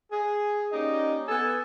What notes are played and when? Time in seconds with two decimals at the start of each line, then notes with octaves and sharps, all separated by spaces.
0.11 G#4
0.71 A#3 C#4 D#4 G4 D5 D#5
1.28 B3 A4 G#5